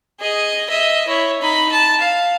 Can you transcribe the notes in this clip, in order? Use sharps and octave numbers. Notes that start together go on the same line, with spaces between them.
G#4 D#5
D#5 E5
E4 C#5
D#4 B5
A5
F5